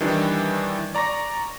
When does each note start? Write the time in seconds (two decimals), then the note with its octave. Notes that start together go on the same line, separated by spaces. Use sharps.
0.01 D#3 E3 G3 D4
0.95 D5 A#5 C#6 A#6